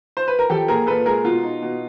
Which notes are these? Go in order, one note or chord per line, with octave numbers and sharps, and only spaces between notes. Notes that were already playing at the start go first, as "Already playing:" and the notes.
C5
B4
A#4
F3 G4 A4
A#2 G#4 A#4
A#2 A4 B4
G#3 G#4 A#4
B2 F4
D#4
B2